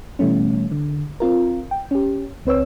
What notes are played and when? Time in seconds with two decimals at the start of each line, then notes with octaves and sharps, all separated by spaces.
0.19 B2 E3 G3 A3 C#4
0.71 D3
1.20 C4 F4 A#4
1.71 G5
1.91 C#4 G4
2.45 C#2 C4 B4 C#5 E6